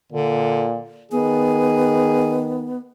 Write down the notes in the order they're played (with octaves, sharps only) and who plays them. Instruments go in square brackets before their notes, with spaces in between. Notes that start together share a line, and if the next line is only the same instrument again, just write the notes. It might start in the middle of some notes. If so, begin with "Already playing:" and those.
[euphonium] A#2 [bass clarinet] D3
[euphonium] D#3 [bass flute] B3 [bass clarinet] G#4